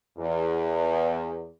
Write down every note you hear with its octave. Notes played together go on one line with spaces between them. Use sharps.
E2